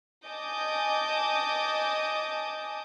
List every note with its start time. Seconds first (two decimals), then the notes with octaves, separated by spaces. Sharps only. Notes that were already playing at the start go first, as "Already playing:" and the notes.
0.28 D#5 G#5 A5 D6 D#6 G6